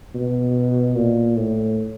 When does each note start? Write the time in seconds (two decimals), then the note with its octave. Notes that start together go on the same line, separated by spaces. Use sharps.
0.15 B2
0.96 A#2
1.36 A2